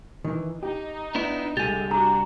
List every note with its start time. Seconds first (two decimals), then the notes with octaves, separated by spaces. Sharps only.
0.24 D#3 E3
0.63 D#4 G4
1.15 B3 D4 E4
1.57 C2 D3 G#3 G4 G#5 A6
1.91 D4 F#4 A#5